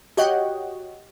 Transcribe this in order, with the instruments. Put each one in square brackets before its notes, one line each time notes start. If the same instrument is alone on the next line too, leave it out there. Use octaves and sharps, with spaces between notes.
[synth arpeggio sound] F#4 G4 C#5 D#5 F#5 G5